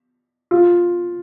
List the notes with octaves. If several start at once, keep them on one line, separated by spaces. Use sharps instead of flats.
F4